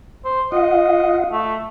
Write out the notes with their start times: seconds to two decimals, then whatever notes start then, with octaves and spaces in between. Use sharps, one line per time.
0.25 C5
0.52 F4 D#5 F5 F#5
1.32 A3